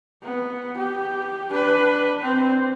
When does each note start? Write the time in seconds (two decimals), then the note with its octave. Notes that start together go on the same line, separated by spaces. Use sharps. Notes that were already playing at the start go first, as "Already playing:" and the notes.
0.23 B3
0.78 G4
1.51 D4 B4
2.21 C4 C5